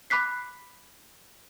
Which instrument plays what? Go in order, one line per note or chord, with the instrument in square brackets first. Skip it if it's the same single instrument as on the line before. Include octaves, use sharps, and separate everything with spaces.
[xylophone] B5 D6 F#6 B6 C7